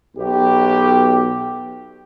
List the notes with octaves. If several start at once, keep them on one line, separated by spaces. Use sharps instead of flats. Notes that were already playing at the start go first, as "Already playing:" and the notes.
B1 G4